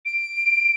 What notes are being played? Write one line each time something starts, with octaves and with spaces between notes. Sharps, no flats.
D7